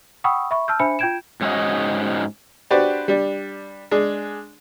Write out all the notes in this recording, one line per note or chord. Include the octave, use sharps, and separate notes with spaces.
F#5 G5 B5 C#6 D#6 E6
E5 B5 C#6
A5 E6 F6 G6
D4 C5 E5 G#5 B5 C#7
F4 G5 G6 G#6 D7 E7
G#2 C#4 D#4 F#4 D#5
D4 F#4 G4 B4 C5 D5
G3 D4
G#3 D4 G#4